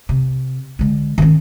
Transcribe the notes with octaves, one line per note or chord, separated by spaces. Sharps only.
C3
D3 G#3
D#3 C#4